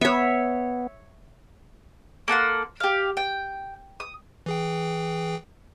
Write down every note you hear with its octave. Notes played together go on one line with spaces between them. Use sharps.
B3 C#5 E5
A#3 A4 F#5 C6
G4 F5
G5
D#6
E3 G#4 G5